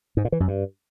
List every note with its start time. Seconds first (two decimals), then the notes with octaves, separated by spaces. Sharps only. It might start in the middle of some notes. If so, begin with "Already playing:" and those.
0.17 G#2
0.25 A#2
0.32 E3
0.40 F#2
0.48 G2